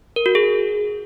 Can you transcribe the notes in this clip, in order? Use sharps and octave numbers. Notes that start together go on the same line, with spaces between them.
A#4
F#4
G#4